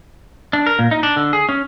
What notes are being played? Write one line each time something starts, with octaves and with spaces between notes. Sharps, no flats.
D4
A#4
A#2
D#4
D4
D3
G#4
C#4